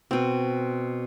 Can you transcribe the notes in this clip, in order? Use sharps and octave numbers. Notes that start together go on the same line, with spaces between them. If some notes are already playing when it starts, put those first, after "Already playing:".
B2 C4